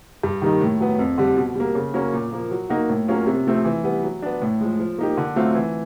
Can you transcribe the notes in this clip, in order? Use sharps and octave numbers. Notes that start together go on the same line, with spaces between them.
G2
D#3 G3 A#3 D#4
A2
F#3 B3
F2
D3 G3
B2
G3 A#3
C#3
F#3 A#3 C#4
A#2
F3 A#3
F#3
A#3 D#4 F#4
A2
F#3 A#3 C#4 F4
C3
F3 A3 C4
E3
G3 B3
F#3
B3 D4
A2
F3 G#3
F3
A#3 D#4 G4
D3
F#3 A3 C4 F4
E3